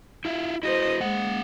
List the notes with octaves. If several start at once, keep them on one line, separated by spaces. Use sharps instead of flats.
E4 F4 E5
E4 F#4 B4 C5 D#5
G#3 A#3 F#5